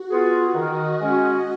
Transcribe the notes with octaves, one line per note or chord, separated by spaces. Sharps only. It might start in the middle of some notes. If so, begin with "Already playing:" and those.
Already playing: F#4
B3 F4 G#4
D#3 D#5
G#3 C#4 F#4